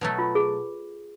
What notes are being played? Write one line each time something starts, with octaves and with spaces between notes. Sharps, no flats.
B2 F#3 A3
F4
G#4